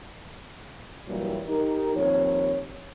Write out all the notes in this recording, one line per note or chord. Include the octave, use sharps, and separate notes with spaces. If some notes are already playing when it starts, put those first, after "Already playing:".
G2 A#2 E3 F#3 G3
D#4 G4 A#4
D#2 F3 C4 C#5